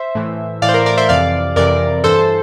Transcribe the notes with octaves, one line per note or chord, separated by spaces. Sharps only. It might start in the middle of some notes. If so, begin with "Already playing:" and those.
Already playing: C5 E5
A2 E3
A2 E3 D5 F5
C5
A#4
A#4 D5
C5 E5
F2 C3 E3 D5 F5
F2 C3 E3 A#4 D5
G2 E3 A4 C5